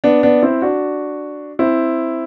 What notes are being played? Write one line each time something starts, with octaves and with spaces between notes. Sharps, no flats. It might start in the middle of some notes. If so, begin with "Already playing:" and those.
B3 D4
B3 D4
C4 E4
D4 F#4
C4 E4